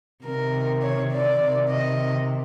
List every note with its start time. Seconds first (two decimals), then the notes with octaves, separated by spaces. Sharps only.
0.24 C3 D#3 A#4
0.82 C#5
1.11 D5
1.40 C3 D#3
1.70 D#5